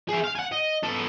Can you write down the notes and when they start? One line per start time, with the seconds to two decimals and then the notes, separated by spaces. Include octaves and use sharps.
0.09 G#4 E5
0.24 F5
0.35 F#5 G#5
0.52 D#5
0.83 B3 A4